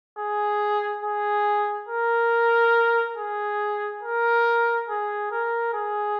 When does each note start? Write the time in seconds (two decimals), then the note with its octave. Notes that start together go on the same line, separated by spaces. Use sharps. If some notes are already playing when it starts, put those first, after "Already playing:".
0.18 G#4
1.03 G#4
1.89 A#4
3.17 G#4
4.03 A#4
4.89 G#4
5.31 A#4
5.73 G#4